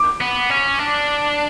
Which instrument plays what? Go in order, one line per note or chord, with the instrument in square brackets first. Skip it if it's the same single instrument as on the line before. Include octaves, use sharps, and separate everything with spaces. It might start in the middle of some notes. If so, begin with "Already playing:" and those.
Already playing: [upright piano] D6
[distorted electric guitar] B3
C#4
D4